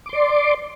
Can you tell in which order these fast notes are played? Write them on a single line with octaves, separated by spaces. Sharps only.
D6 C6 D5